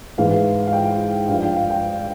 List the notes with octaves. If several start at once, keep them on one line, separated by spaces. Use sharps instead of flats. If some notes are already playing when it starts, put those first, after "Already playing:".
G#2 E3 F5
F5
G5
G2 F3 F5
G5
F5
G5